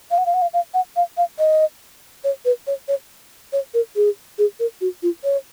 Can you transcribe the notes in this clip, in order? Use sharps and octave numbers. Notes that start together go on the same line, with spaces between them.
F5
F#5
F5
F#5
F5
F5
F#5
F5
F5
D#5
C#5
B4
C#5
C#5
C#5
A#4
G#4
G#4
A#4
F#4
F4
C#5